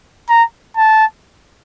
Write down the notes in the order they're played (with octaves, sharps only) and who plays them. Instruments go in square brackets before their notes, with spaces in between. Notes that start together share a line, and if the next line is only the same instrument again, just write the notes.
[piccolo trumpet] A#5
A5